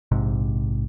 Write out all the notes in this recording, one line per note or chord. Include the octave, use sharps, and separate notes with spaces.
A#1 G#2 C3